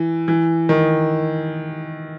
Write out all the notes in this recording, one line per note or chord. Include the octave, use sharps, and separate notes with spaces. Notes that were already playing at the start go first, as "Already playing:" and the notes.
Already playing: E3
E3
D#3